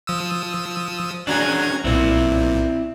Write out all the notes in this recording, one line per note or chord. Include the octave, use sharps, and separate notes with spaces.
F3 D#6 E6
C#4 D4 F#4 G#4 A#5 G#6
B1 A#2 C4 E4